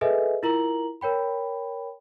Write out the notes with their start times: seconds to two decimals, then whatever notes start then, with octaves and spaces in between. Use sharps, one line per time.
0.01 G#4 A4 B4 D#5 E5 G#5
0.43 E4 F4 A#4 A#5 F#7
1.01 A#4 C#5 G5 B5